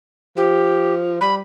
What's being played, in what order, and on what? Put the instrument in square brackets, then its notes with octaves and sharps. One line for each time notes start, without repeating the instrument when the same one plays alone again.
[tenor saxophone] F3 [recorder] G4
[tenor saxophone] G3 [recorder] B5